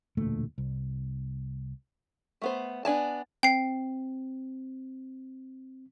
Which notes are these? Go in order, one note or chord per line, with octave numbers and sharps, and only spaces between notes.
E1 D2 A#2 A3
C2
A3 B3 C5
B3 D4 G#5 A5
C4 G5 C7